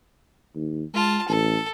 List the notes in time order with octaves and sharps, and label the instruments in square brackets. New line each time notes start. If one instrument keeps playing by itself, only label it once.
[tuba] D#2
[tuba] G#3 [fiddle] F4 A5
[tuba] A1 [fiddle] A4